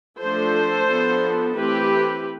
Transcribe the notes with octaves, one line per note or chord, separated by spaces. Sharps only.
F3 A3 D4 A4 C5
F3 B3 D4
E3 A3 C4 G4 B4